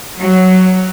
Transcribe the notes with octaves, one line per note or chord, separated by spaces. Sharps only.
F#3